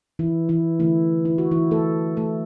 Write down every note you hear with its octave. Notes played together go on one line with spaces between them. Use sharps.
E3 E4
E3 E4
D3 E3 A3 E4
E4
F#4
E3 E4
A3 A4
A3 A4